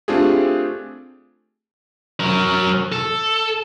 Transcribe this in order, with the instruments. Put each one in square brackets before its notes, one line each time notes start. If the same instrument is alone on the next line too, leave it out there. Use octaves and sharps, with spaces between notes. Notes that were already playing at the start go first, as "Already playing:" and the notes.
[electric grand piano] A3 C4 D4 F4 G4 G#4
[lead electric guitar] F#3 A#4
A4